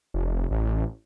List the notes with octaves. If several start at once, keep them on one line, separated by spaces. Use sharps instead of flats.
F1
A1